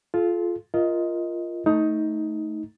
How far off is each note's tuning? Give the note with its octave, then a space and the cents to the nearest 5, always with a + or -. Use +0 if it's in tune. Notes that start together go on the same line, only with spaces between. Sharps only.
F4 +0 A4 -40
F4 -10 A#4 +0 D#5 +10
A3 +0 D#4 +15